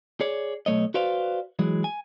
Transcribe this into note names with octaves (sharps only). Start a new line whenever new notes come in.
G#4 C#5 D5
B1 D#3 A3 C#5 D#5
F#4 B4 C5 D5 F5
E3 F#3 G#3
G#5